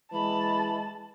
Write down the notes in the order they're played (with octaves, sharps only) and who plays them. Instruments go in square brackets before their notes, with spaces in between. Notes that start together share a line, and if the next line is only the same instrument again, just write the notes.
[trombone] E3 [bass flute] G#3 [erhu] A5 [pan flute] B5